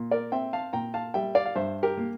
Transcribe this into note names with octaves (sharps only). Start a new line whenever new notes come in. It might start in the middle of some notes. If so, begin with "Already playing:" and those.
Already playing: A#2
A#4 D5
C4 E5 G5
F5 A5
A#2 G5 A#5
F5 A5
G3 E5 G5
D5 F5
F5
G2 C5 E5
G4 A#4
A#3